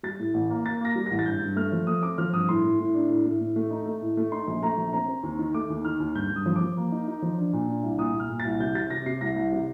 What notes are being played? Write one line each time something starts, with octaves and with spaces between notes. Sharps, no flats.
G3 A6
A2
A1
A#3
A#3 A6
A#3 A#6
G3
A1 A#6
A6
G2 G6
G2
A3 F6
F3
A3 D#6
C4 D6
F3 F6
G2 D#6
A2 C6
A2
A2
D4
A2
A2
A2
A3
D#4
A3
A2
A3
D#4 C6
A#1
A3 A#5
A#1
C4 A#5
C4
D#2
D#3
A3 D6
D#2
D#3 F6
D#2
G2 G6
G2
D#6
F3
D6
F3
A#3
D#4
D#4
F3
D4
A#2
D4
C2
A#2 D#6
A#2
F6
A#2
A6
C2
C3 G6
C3 A6
C3 A#6
C3 C7
C2 A#6
C2
C3